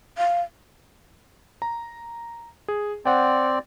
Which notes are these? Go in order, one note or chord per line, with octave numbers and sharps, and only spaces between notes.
F5
A#5
G#4
C4 C5 D5 F#5 G5